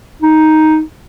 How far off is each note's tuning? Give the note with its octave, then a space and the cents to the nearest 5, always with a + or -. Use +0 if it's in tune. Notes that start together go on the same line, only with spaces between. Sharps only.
D#4 +5